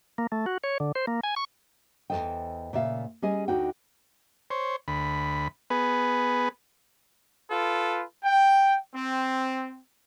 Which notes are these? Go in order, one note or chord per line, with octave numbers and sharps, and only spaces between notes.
A#3
A3
F#4
C#5
D3
C5
A#3
G#5
C#6
E2 A#2 A4 C5 D#5 G5
A#2 C#3 A3 E5 F5
G3 C#4 G#4 D#5 G#5
D2 D3 D#4 F#4 G5
C5 C#5
D2 B5
B3 G#4 B4
F4 A4 B4
G5
C4